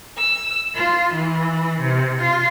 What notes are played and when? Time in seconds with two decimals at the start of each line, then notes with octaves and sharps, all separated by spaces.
0.17 E6
0.73 F4
1.13 E3
1.79 C3
2.18 F4